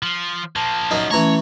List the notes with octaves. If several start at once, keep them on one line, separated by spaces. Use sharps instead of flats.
F3
F3 A#3 A5
F#2 D#4
E3 A3 C#4 C#5 A#5 C#6